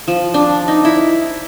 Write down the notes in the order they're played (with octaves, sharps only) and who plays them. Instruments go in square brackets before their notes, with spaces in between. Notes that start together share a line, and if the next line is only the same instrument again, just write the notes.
[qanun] F3
D4
D#4
E4